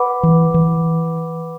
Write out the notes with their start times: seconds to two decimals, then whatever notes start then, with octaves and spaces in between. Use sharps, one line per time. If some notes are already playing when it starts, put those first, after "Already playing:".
Already playing: B4 F#5 B5 D6
0.23 E3
0.54 E3